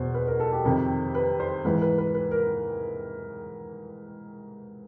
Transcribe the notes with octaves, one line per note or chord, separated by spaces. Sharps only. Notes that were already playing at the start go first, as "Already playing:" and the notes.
Already playing: E2 B2 C5
B4
A#4
A4
G4
F2 C3 D#3
B4
C5
G#2 E3 B4
B4
B4
B4
A#4